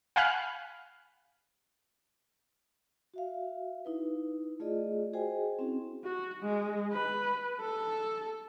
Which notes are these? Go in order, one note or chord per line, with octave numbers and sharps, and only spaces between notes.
F5 F#5 G#5 B5 F6 F#6
F#4 E5 F5
D#4 E4 B4
A3 F4 G#4 D5 D#5
F#4 G#4 C5 D#5 G5 G#5
C4 C#4 E4 F#4 G#4
F#4
G#3
B4
A4